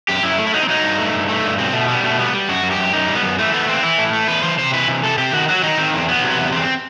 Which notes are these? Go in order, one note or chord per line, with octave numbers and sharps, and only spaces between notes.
F#2 G4
F#2 E4
A3
E4
F#3 D#4
C4
F#3 D#4
G2
A3
G2
A3
G2
B2 C4
B2 A3
G3 B3
B2 A3
G3 B3
G3
F#2 F#4
F#2
G4
F#2
F#2 D#4
G3
B3
F#2
E3 A3
A3 B3
E3 C4
E3 E4
A2
A3
E2 B4
E3 C5
C3 C5
E3 B4
C3
C3 A4
C3 G4
D#3 F#4
F#3 F#4
D#3 D#4
D#3 C4
E2 C4
F#3 B3
C3
B3
E2
E2 C4